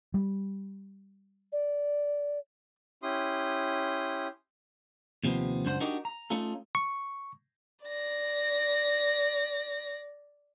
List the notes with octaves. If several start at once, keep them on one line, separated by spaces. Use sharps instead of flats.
G3
D5
C#4 E4 G4 C6 D#6
D#2 C3 F3 B3
C#2 F#2 D4 C5 F#5 C6
D4 D#4 F#4 G4 A#4 D#5
A#5
A3 C#4 D#4 F4 A4
C#6
D5 A#6